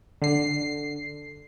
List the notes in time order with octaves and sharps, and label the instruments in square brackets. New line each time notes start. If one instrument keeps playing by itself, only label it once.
[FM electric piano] D3 C7